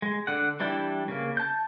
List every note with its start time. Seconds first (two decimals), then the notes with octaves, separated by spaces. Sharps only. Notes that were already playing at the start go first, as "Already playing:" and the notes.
0.02 G#3
0.27 D3 F#5
0.60 E3 G3 D4 E4 G5
1.08 C#3 A#3
1.37 A5 G6